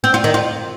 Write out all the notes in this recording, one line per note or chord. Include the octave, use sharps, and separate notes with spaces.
C4
F4
D#3
F4